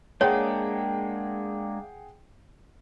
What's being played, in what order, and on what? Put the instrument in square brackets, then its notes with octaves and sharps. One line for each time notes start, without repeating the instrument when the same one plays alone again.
[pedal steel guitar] G#3 A#3 D4 [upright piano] G#4 F#5 G5 [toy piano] C#5